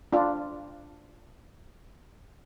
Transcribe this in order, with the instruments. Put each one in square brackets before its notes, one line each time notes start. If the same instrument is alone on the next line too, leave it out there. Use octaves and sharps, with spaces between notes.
[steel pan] D4 F4